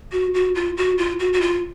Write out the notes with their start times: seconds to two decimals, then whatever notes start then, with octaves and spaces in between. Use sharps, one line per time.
0.12 F#4
0.34 F#4
0.55 F4
0.77 F#4
0.98 F4
1.20 F#4
1.33 F#4
1.41 F4